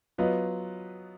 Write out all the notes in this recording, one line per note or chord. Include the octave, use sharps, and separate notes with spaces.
F#3 B3 F4 B4 D#5